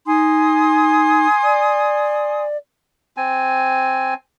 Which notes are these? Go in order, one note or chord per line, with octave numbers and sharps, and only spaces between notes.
D#4 G#5 C6 D#6
D5
C4 G#5